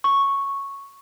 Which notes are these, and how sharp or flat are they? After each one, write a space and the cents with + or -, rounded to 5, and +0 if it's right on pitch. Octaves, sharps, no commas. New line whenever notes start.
C#6 -5